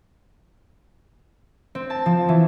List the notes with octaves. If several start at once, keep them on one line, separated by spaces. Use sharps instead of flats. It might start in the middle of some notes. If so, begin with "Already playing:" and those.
C4
A5
F3
E3